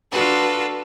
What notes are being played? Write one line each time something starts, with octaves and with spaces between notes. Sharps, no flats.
D4 F4 F#4 A4 B4